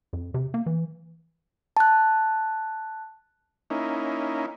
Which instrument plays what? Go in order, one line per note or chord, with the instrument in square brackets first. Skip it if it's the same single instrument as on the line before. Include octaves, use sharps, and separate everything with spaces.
[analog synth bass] F2
C3
A#3
E3
[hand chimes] A5 F#6
[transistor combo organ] A#3 C#4 D#4 E4